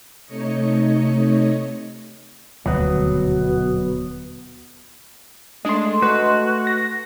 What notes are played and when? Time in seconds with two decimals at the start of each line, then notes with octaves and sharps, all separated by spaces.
0.25 C3 A3 D#4 C#5 D#5 C#7
2.66 D#1 D2 B2 F#3 B3
5.65 G#3 A3 D4 D#5 C6
6.02 F#4 B4
6.67 A#6